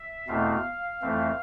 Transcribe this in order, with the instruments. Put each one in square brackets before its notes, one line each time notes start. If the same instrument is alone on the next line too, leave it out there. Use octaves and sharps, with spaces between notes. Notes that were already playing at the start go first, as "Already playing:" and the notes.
Already playing: [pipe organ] E5
E2 B2 A3 C4 F5
F2 E3 A3 C4